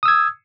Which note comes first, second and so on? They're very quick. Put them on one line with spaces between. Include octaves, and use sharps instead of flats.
D#6 E6 G#6